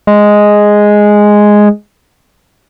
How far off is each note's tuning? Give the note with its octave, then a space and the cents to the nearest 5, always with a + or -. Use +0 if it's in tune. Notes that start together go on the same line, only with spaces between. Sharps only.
G#3 +0